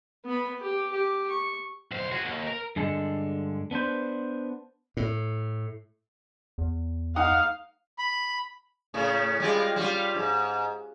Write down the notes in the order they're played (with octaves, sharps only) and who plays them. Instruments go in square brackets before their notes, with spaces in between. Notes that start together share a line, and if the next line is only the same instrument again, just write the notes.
[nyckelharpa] B3 B5
G4
G4
C#6
[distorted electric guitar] B1 C5
F#4 G#4
D#2
A#4
[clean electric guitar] G2 D3 G#3 A4
B3 D4 B4 C5
[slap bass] A2
[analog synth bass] E2
[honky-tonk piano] D#4 F#5 D#6 [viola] F5
[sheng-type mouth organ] B5
[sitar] A2 C#3
G3 G#3 F4
G3 F4
G#2